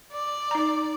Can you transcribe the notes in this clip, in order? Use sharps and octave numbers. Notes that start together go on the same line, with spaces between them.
D5
D#4 A#5